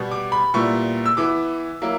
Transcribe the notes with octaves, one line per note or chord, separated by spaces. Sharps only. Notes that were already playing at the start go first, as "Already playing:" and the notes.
Already playing: B2 G3 B3
D6
B5
A#2 G3 B3 E4 C#6
E6
E3 B3 E4 D6
F#3 A#3 E4